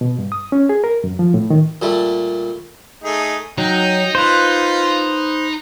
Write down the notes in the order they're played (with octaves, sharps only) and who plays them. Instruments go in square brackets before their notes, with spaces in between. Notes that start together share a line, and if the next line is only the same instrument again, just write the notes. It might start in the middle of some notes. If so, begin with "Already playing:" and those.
[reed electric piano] B2
G2
D#6
C#4
G#4
A#4
F#2
F3
A2
D#3
[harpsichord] A#2 G3 A3
[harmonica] A3 D#4 G#4
[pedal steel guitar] F#3 [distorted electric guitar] D#4 [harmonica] G5
[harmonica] F4 [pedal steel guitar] B4 C5